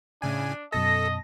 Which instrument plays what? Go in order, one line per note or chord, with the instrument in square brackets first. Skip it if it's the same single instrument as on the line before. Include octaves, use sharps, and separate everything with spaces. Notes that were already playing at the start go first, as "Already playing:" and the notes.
[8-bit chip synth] A2 C#3 G#5 [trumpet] D4
[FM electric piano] F#2 B2 A5 [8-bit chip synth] A4 [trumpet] D#5 [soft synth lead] A#6